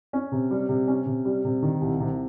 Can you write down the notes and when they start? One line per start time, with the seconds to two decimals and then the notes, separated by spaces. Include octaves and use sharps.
0.13 C#4
0.32 C3
0.51 G3
0.69 C3
0.88 C#4
1.06 C3
1.25 G3
1.44 C3
1.62 D#3
1.81 C2
2.00 C3